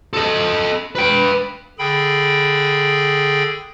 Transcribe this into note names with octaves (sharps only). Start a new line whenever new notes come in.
A4 D#5
B4 G5
D3 G#4 G5 B5